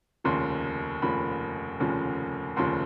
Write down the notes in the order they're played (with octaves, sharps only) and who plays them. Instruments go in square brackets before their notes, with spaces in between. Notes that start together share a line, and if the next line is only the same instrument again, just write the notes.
[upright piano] F1 D#2 C#3 F3 C6
F1 D#2 C#3 F3 B5
F1 D#2 C#3 F3
F1 D#2 C#3 F3 C6